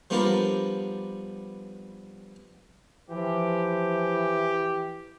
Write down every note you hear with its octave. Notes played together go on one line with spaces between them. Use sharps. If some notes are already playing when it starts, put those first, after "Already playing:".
F3 G3 B3 D4 F4 A#4
E3 F3 G4